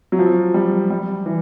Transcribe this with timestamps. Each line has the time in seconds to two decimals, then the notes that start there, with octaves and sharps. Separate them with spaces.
0.12 F#3
0.19 F3
0.54 G3
0.90 G3
1.26 E3